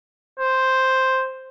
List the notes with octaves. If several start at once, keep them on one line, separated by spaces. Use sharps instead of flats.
C5